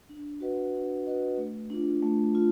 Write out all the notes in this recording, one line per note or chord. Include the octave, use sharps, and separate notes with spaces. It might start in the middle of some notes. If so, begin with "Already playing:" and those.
D4
F#4 B4 D#5 F#5
D4
F#4 B4 D#5 F#5
A3
D4 F4
A3
F4